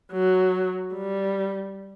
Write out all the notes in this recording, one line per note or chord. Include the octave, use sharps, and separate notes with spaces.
F#3
G3